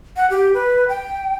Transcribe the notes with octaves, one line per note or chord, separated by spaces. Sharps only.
F#5
G4
B4
G5